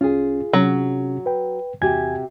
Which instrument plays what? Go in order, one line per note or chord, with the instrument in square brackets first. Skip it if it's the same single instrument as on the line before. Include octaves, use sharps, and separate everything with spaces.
[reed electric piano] C2 C#4 [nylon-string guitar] F4 G#4
[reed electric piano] C3 C#4 [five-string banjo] F#3
[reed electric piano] B4 G5
[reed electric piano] E2 G#5 G#6 [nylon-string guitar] C3 F#4 G4